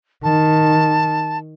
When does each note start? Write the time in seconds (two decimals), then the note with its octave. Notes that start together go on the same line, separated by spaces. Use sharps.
0.23 D#3 A5